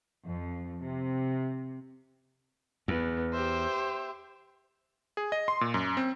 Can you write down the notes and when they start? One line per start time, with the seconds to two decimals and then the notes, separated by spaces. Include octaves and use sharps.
0.24 F2
0.80 C3
2.88 E2 B3
3.34 G4 C5 E5
5.17 G#4
5.32 D#5
5.48 C6
5.61 A#2
5.74 F#2
5.97 C4